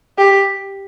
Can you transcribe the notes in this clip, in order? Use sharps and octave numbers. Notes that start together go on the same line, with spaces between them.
G4